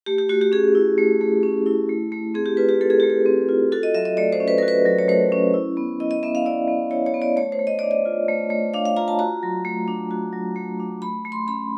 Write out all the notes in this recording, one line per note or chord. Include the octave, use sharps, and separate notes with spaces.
A3 G4
G4
A3 F#4
G4
C#4 G#4
E4
A3
A3
C#4
E4
A3
A3
C4 G#4
G4
F4 B4
G4
A3 A4
G#4
A3 G4
G#4
C4
F4
F#4 A4
D#5
F#3 E5
D#5
A3 D5
C5
C#4
B4
F#4 A#4
B4
F#3
C#5
A3 C5
C#4
E4
B3
E4 D#5
D#5
B3 E5
F5
E4 D5
B3
E4 C#5
C#5
B3
D5
A3 C#5
C5
A3
D#5
D4 D5
D#5
F4
A3
A3
D4 F5
F5
F4 A#5
A5
F#4 A#5
F#3
A3
D4
F#4
F#3
A3
D4
A3 B5
A3
C6
C#4 B5